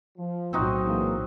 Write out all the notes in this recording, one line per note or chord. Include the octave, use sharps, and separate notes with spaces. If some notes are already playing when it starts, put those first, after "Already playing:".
F3
B1 A2 F#3 C4 D#4 F#4
E3 G#3 A#3